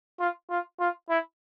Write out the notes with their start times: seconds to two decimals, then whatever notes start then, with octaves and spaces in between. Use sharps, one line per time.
0.20 F4
0.50 F4
0.80 F4
1.10 E4